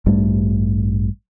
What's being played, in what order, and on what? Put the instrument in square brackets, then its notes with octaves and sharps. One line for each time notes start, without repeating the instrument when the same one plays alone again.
[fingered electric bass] A1 G2 G3 A3